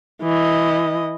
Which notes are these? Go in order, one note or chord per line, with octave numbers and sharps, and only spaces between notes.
E3 D#5